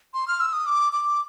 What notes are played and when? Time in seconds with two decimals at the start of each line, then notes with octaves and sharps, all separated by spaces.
0.14 C6
0.28 F6
0.40 E6
0.53 D#6
0.66 D6
0.93 D6